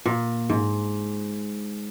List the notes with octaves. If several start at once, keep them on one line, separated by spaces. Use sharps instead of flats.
A#2
G#2